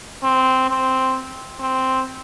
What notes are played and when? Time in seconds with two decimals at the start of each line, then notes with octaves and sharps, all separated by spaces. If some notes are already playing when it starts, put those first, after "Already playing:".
0.24 C4
0.70 C4
1.60 C4